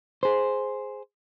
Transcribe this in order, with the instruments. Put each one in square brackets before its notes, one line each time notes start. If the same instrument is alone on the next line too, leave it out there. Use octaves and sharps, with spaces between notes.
[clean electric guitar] G#4 C5